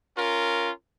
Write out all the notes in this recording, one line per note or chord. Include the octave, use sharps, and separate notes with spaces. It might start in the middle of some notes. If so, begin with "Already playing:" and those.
C#4 F4 A#4